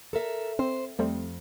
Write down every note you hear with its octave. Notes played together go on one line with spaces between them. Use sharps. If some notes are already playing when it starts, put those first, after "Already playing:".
A4 A#4 E5
C4 C5
F2 G3 A3 C4